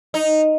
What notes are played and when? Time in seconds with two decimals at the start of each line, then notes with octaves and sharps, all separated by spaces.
0.14 D#4